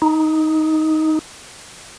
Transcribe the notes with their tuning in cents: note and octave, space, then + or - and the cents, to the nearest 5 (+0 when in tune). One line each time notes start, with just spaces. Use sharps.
D#4 +10